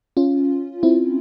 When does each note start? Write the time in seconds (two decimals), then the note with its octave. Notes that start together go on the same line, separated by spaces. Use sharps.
0.17 C#4 F4
0.83 C4 E4